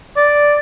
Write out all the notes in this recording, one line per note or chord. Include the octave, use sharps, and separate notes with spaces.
D5